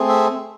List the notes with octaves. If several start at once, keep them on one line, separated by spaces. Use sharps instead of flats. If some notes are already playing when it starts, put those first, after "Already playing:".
Already playing: A3 C4 G#4
E5